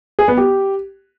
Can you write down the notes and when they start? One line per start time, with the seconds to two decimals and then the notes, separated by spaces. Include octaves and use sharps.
0.19 G#4
0.28 B3
0.37 G4